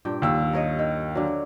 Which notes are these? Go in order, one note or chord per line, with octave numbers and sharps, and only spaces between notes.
G2 A#2 G5
D#2 E6
A#4 C#5 D#5
D#3
D3 F#3